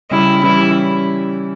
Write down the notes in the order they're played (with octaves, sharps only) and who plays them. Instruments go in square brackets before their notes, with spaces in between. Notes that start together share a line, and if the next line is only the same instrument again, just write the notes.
[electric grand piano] C#3 G3 C#4 G4 [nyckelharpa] E4
[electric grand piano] E3 G3 C#4 G4 [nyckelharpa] E4